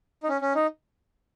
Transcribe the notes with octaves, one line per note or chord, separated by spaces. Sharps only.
D#4
C#4
C#4
D#4